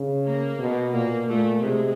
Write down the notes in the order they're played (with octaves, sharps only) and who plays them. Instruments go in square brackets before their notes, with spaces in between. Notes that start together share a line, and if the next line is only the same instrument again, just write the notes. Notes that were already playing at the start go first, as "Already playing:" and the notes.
Already playing: [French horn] C#3
[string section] A#3
[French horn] B2
[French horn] A#2 [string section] A#3
[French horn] A#2 [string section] A3
[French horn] C3 [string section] G#3